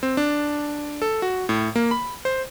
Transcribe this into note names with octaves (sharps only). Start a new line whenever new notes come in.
C4
D4
A4
F#4
A2
A#3
B5
C5